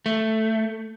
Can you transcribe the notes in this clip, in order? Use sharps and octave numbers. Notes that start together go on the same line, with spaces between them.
A3